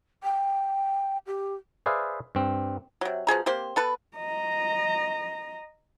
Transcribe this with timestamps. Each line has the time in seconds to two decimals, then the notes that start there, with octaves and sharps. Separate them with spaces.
0.23 G5
1.27 G4
1.86 G#4 B4 C5 D5 E5 F5
2.35 G2 C4
3.01 C3 F#3
3.27 B2 F3 G#4 A#5
3.46 A#3 C4 G4 C5
3.76 B3 A4 B4
4.17 D#5 A#5